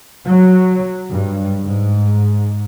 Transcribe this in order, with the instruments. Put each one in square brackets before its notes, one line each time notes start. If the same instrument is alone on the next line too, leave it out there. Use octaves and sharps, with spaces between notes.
[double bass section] F#3
G2
G#2